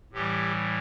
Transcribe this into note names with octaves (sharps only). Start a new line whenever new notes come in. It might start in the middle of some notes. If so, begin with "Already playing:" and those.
A2 E3 G3 G4